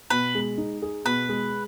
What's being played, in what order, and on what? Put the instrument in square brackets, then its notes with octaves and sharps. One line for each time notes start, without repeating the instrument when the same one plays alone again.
[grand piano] B2 [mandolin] B4
[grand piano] G#3
D#4
G#4
[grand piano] B2 [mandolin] B4
[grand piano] G#3